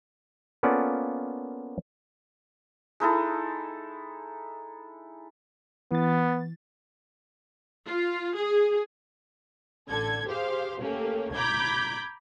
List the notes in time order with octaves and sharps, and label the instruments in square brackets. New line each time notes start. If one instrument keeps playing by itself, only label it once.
[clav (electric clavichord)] A#3 B3 C#4 F4 A4 D5
[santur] G#3 D#4 E4 A4
[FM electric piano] E3 A6 [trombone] B3
[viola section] F4
G#4
[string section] A1 D3 A4 G#6
G4 G#4 C5 F5
A3 A#3 C#4 G4
A#5 B5 D6 G6 G#6